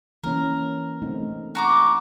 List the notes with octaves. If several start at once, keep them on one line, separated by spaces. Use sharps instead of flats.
E3 A#3 C#4 A#4
A3 C4 D#4
F#4 A#5 D6